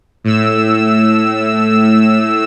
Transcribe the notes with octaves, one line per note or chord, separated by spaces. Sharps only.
A2 E6